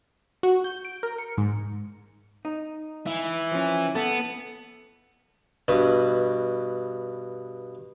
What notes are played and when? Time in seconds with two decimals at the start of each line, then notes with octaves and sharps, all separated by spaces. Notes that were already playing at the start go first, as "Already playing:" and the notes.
0.43 F#4
0.64 G6
0.85 D7
1.03 A#4
1.18 C#7
1.38 G#2
2.45 D#4
3.07 E3
3.52 F3 C#4
3.95 B3 A4
5.68 G2 B2